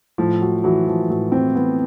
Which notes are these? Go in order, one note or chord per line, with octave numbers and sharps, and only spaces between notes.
A2 F3
F#3
E3 F#3
F3
A2 F#3
C4
E3 B3